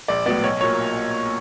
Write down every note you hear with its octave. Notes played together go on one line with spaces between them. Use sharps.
A#1 D5
A2 F#3 B3 D5
B1 C#5
A#2 F#3 A#3 C#5